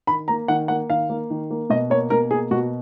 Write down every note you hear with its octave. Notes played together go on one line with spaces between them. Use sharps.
D#3 B5
A#3 A#5
D#3 F#5
A#3 F#5
D#3 F5
A#3
D#3
A#3
B2 D#5
A#3 C#5
B2 A#4
A#3 G#4
B2 F#4